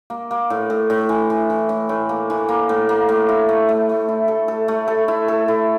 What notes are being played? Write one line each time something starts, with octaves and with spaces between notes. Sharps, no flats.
A#3
A#3
A2
A2
A2
E3
E3
E3
A2
A2
A#3
E3
A#3
A2
A#3
A2
E4
A3
A3
A3
E4
A4
A4
A3
A4
E4
A4
E4